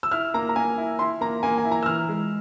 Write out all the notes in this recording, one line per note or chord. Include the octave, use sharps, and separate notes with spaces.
E6
E4 F6
A#3 A#5
A#5
A#3 G#5
E4
E4 C6
A#3 A#5
A#3 G#5
G#5
E4
A#5
E6
E3 F6
G#3